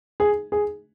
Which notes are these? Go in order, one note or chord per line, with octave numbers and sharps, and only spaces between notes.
G#4
G#4